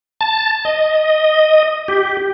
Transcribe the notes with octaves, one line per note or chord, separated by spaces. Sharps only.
A5
D#5
G4